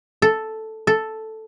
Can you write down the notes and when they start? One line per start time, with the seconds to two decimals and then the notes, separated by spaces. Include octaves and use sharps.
0.22 A4
0.87 A4